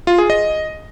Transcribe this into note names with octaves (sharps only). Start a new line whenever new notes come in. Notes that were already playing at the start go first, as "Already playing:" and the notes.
F4
G#4
D#5